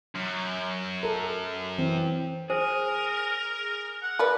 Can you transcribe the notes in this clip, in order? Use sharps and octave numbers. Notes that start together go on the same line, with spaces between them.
F#2
A4 A#4
E3 C4
G#4 A#4 C5
F#5
A#4 B4 D5